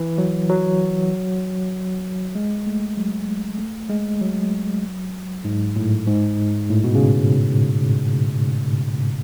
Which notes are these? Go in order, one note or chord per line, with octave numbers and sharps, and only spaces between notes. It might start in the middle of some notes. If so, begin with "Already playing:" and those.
Already playing: E3
F#3
F#3
G#3
A3
F#3
A3
G#3
F#3
G#2
A2
G#2
A2
B2
C#3